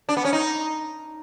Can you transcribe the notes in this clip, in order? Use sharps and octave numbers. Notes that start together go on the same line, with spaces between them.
D4
B3
C#4
D#4